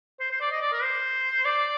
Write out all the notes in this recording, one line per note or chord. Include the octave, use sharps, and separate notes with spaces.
C5
C5
D5
D#5
D5
A#4
C5
D5